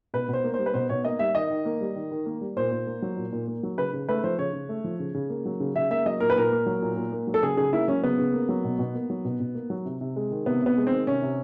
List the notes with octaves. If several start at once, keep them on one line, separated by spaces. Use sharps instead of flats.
B2 B4
B2
C5
A#3
C5
G3
B4
B2 C5
B2 C#5
A#3 D#5
G3 E5
D#3 D#5
D#3
A#3
G3
D#3
D#3
A#3
G3
A#2 C5
A#2
A#3
F#3
A#2
A#2
A#3
F#3
C#3 B4
C#3
A3 B4
F3 C5
C#3 C#5
C#3
A3
F3
C#3
C#3
A#3
F#3
C#3
C#3 E5
A#3 E5
F#3 D#5
A#2 A#4
B4
A#2 A#4
A#3
F#3
A#2
A#2
A#3
F#3
A4
C#3 G#4
C#3 G#4
A#3 E4
F#3 C#4
C#3 B3
C#3
A#3
F#3
B2
B2
A#3
F#3
B2
B2
A#3
F#3
C3
C3
G#3
D#3
C3 B3
C3 B3
G#3
D#3 C4
C3 C#4
C3